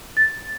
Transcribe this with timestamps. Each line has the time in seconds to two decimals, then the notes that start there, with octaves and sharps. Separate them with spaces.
0.17 A6